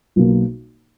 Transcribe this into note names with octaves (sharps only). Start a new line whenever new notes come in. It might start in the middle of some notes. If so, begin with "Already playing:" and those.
B1 B2 A#3